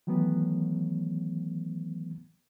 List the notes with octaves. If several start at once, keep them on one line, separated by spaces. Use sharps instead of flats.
D#3 E3 F#3 A3 B3